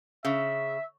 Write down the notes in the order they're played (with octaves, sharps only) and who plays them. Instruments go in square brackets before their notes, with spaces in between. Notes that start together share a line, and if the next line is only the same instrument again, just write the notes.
[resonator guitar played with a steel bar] C#3 [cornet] E5